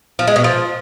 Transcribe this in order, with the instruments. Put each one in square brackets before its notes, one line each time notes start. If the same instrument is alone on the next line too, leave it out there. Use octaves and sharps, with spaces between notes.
[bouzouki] F3
G#3
B2
F3